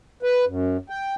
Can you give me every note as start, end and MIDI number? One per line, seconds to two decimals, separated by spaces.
0.23 0.45 71
0.47 0.77 42
0.90 1.15 79